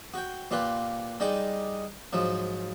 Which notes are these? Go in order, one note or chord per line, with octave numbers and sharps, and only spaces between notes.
F#4 G5
A#2 F4 G4 B4
G3 G#3 D#4 D6
G#2 F3 F#3